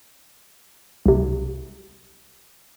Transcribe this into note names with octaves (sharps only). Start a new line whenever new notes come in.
C2 C3